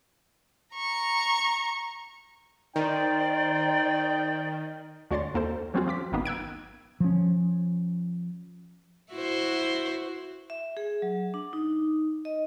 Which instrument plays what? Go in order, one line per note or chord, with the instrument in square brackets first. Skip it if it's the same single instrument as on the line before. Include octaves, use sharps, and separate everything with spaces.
[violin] A#5 C#6
[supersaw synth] D#3 [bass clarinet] D#4 [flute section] C5 D5 [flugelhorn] G5
[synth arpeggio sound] D2 F#4 C#5 D5 C6 A6
D#2 A#3 A4 C5
F3 F#3 C4 C#4 F4 F#4
F3 F4 D6 B6
G#1 D#3 A#3 B3 D#4
E6 F#6 G#6 D7
[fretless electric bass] F3 C#4
[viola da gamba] E4 F#4 C5
[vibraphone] E5
G#4
F#3
D4
D#4
D#5